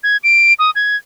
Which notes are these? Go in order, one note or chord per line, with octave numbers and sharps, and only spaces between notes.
G#6
D7
D#6
G#6